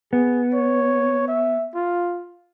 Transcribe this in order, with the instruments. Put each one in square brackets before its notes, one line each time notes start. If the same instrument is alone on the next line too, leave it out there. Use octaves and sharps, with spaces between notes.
[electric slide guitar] B3 [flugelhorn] G#4
[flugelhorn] C#5
E5
F4